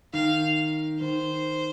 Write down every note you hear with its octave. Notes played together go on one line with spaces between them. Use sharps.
D#3 F5
D#3 C5